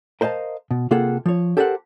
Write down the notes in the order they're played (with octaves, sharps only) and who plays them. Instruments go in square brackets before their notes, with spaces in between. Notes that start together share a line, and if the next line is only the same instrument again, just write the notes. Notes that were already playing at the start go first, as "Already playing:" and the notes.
[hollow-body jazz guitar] A#4 C5 D#5 F5 A5
B2
C3 A#3 F4 G#4 A4 F#5
F3 C#5
G4 A4 A#4 C5 F5 F#5